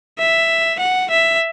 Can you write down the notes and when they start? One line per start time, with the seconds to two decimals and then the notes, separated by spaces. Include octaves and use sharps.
0.19 E5
0.79 F#5
1.10 E5